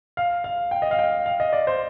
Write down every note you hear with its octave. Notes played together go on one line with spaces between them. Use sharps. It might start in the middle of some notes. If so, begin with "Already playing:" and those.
F5
F5
G5
D#5
F5
G5
F5
D#5
D5
C5